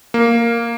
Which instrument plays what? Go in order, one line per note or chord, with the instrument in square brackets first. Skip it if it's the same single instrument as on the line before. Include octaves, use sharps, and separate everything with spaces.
[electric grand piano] A#3